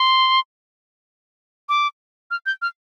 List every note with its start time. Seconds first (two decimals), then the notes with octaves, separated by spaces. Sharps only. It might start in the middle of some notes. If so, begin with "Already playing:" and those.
Already playing: C6
1.69 D6
2.31 F6
2.46 G6
2.62 F6